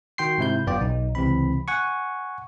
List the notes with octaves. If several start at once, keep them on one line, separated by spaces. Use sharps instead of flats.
D#3 F#4 G5 C6 C7
G#2 C3 E4 G6
G1 F#2 B3 F4 D5 G5
B1 D#4
C#2 C3 E3 C4 B5
F#5 G#5 C#6